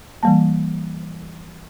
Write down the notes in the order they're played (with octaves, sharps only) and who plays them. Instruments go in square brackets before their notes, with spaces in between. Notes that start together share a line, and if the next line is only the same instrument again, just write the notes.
[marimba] E3 G3 A#3 A5